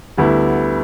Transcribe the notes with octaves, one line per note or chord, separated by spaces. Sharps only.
D2 D3 G3 B3 E4